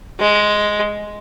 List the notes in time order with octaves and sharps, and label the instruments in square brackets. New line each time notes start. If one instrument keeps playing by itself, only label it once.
[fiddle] G#3